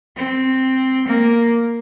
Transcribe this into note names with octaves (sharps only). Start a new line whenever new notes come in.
C4
A#3